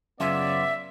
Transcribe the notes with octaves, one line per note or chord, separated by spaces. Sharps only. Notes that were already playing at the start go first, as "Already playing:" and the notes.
F#2 C#3 B3 C#4 F4 D5 E5